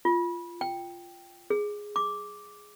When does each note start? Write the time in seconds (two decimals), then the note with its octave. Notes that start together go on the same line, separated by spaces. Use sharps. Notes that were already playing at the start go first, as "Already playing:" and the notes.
0.05 F4
0.61 G5
1.50 G#4
1.96 D6